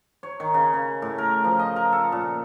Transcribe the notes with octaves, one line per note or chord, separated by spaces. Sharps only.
C#5
D#3
C#3
C#3
A2
A#4
F3
D#5
A#4
A4
A#2